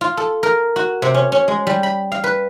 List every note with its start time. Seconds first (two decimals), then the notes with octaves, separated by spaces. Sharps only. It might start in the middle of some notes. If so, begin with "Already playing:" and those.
0.01 F4
0.17 A4
0.43 A#4
0.76 F#4
1.02 C3
1.14 C#4
1.32 C#4
1.48 G#3
1.67 G3
1.83 B5
2.12 F5
2.24 B4